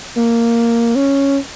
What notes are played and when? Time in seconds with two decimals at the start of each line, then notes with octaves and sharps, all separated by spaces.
0.17 A#3
0.96 C#4